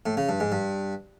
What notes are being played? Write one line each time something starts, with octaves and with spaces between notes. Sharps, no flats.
A2
C#3
G2
G#2
G2